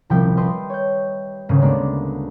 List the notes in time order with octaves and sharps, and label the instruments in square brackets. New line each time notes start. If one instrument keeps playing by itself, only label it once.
[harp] D#1 C2 F3 G3 E4 G5
B4 D#5 E5 G5 A5 C6
C#5 G6
D#1 D2 G#2 C#3 D#7
G#3 A#3 B3 D4 D5